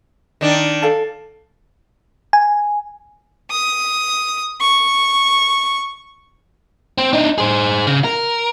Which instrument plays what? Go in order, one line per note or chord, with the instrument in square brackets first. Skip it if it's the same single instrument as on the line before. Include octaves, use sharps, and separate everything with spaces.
[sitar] D#3 D4
[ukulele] A4 F5 A5
[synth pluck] G#5
[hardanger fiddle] D#6
C#6
[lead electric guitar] C4
D4 D#4
G#4 C5
C#3
A#4